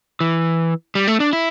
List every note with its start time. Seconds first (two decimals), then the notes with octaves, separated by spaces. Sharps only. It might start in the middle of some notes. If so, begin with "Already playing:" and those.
0.21 E3
0.95 G3
1.07 A3
1.20 D4
1.33 E4